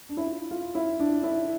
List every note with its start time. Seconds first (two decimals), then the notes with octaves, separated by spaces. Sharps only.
0.09 D4
0.17 E4
0.27 F4
0.51 F4
0.75 E4
1.00 D4
1.23 E4